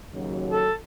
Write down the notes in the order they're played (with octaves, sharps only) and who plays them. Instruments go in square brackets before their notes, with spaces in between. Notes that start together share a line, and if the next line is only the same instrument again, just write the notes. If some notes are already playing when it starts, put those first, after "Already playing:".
[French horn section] D#2 C#3 F#3
[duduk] A4